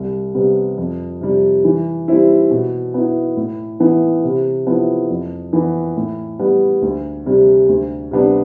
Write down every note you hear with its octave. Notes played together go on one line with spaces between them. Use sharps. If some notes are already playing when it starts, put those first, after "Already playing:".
Already playing: C2
C3 G3 B3
F2
C3 G3
E3
G3 C4 E4
B2
B3 E4
A2
E3 B3 E4
C3
F3 B3 E4
F2
E3 B3
A2
G3 B3
D2
C3 G3
D2
C3 G3 B3 D4